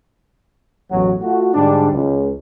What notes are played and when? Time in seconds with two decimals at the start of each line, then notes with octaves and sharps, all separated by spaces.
0.91 A1 E2 B2 F#3 F#4
1.22 A3 F4 F#4
1.54 G#2 D3 G3 D4
1.92 C#2